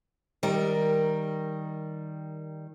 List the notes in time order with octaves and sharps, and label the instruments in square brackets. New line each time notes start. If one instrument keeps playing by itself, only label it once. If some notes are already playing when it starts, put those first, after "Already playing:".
[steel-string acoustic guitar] D#3 G3 A#4